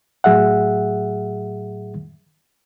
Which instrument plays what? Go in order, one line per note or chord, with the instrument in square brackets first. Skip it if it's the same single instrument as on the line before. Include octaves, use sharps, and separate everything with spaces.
[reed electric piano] A2 F#3 G#4 E5 F#5